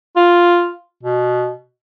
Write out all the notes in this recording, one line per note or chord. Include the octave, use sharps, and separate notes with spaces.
F4
B2